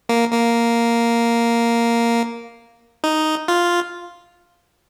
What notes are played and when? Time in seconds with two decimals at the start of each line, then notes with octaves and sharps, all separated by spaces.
0.09 A#3
0.32 A#3
3.04 D#4
3.48 F4